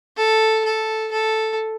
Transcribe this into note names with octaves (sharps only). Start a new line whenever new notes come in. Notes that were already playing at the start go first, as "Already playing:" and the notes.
A4
A4
A4